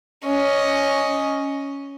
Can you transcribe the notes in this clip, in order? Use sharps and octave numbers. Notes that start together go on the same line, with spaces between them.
C#4 D#5